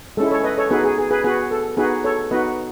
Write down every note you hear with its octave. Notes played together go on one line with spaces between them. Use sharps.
G#3 C#4 E4 A4
A4 C#5
B4 D#5
A4 C#5
B3 D#4 F#4 G#4 B4
G#4
G#4
G#4 B4
B3 F#4 G#4 B4
A4
B3 D#4 F#4 G#4 B4
A4 C#5
B3 D#4 F#4 B4 D#5